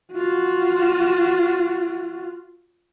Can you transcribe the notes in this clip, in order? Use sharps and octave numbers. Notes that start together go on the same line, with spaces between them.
F4 F#4